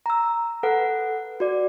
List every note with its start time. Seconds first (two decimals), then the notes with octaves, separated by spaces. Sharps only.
0.06 A#5 E6
0.63 A4 B4 F#5
1.40 F#4 D5